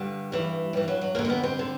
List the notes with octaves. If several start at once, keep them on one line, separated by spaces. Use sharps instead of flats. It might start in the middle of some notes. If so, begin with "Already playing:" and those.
Already playing: G2 D3 G3
G2 E3
G2 E3 G3
F#3
F#3
F2 D3 A#3
C4
B3
C4
D3